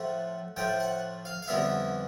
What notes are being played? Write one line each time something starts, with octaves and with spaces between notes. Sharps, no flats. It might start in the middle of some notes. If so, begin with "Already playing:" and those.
Already playing: A2 F3 A3 F#5
A2 F3 A3 G5
F#5
F5
F5
F2 D3 G3 B3 E4 E5